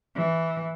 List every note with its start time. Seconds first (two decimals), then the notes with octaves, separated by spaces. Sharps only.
0.16 E3